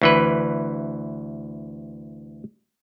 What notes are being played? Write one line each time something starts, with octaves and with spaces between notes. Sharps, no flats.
D2 E3 B4